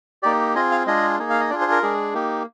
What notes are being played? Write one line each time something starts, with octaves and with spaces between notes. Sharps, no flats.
A#3 D#4 G4 D5
C4 F4 G#4 D#5
F5
G#3 D4 F4 G#4 D#5
A#3 D#4 G#4
F5
D#5
D4 F4 G#4 D5
C5
A#4
G#3 D4 G#4
A#3 D#4 G4